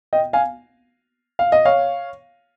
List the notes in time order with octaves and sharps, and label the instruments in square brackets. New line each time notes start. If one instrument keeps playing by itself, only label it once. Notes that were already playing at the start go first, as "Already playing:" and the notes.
[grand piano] D#5 G5
F5 G#5
F5
D#5
C#5 F5